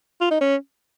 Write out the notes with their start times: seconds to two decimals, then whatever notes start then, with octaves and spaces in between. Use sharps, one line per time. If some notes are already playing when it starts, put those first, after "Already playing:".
0.21 F4
0.31 D#4
0.41 C#4